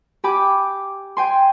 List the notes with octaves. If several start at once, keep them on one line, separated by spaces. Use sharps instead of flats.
G4 G#5 B5 D6
G5 G#5 C6